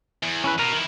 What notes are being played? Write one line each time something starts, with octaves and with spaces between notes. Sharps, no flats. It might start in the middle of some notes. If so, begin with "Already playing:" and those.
E2
C#4 E4 B4
B2 A#4 A#5
D#3 E4